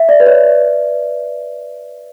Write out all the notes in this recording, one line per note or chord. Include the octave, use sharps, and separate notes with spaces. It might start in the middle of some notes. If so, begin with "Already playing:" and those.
Already playing: E5
D5
B4
C#5